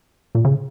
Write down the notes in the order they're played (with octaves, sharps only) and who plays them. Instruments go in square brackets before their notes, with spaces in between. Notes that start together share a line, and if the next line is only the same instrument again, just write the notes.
[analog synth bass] A#2
C#3